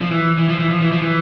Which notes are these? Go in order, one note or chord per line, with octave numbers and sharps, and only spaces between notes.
F3
E3
E3
F3
E3
F3
E3
F3
E3